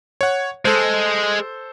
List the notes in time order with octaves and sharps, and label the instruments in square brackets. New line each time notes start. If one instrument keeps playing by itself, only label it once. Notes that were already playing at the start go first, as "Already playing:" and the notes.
[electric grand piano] C#5 F#5
[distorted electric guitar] G#3 [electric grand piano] A4 C5